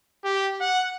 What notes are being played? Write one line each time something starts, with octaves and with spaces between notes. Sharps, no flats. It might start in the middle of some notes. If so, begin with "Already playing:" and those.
G4
F#5